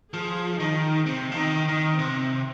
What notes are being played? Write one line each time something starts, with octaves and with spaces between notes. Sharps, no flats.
F3 G#4
D#3 D#4
C3 C4
F3
D#3 D#4
D#3 D#4
C3 C4